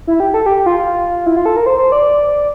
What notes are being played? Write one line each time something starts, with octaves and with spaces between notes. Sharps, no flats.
E4
G4
A4
G4
F4
E4
F4
A4
A#4
C5
C5
D5